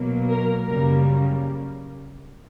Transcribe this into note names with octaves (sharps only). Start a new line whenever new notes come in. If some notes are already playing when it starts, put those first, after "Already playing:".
Already playing: B2 F#3 A#3
A#4
F#2 C#3 G3 A#3 A#4